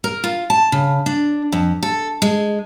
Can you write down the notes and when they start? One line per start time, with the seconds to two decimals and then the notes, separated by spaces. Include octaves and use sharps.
0.04 A#4
0.24 F4
0.50 A5
0.72 C#3
1.06 D4
1.52 F2
1.83 A4
2.22 G#3